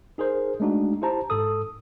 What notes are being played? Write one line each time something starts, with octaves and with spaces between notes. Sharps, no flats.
D#4 G#4 A#4 C5
G#3 A3 D4 D#4 F#4
E4 G4 C5 A5 A#5
G#2 A4 D#6